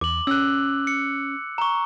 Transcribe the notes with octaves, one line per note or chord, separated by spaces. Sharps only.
E2 D6 F#7
C#4 E6 F#6
C#7
A#5 C#6